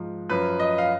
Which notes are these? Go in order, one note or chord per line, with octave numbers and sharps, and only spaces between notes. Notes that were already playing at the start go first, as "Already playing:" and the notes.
Already playing: G#2 F3
F#2 F3 B4
D#5
F5